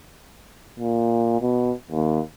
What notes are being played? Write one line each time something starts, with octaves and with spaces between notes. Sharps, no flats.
A#2
B2
D#2